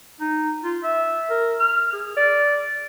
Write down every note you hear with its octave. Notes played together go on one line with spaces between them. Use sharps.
D#4
F4
E5
A#4
F6
G#4
D5